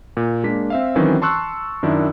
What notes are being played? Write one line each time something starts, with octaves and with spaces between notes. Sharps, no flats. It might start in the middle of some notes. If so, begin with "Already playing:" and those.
A#2
G#3 A#3 D4 B6
C4 E5 F5
D#3 E3 F#3 C4 C#4
A5 C6 C#6 E6 F#6
F#2 D#3 D4 E4